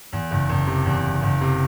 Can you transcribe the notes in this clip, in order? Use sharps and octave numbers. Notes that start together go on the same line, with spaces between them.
E2
F#1
F#1
C3
E2
F#1
F#1
C3